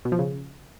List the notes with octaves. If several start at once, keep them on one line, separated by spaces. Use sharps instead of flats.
B2
F3
C#3